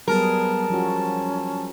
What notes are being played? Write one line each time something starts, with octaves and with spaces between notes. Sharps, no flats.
F#3 G3 B3 G#4 A#4 A5
F3 C#4 F4 F#4